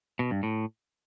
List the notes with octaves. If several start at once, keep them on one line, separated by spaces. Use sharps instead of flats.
B2
G2
A2